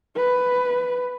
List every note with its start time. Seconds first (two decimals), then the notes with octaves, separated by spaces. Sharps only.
0.17 B4